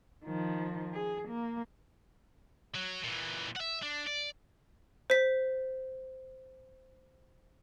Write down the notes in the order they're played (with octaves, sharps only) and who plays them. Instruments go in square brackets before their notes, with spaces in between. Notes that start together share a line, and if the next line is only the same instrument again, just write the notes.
[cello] D#3 F3
G#4
A#3
[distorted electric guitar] F#3
A#2 E3
E5 F#5
D4
D5
[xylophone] C5 B6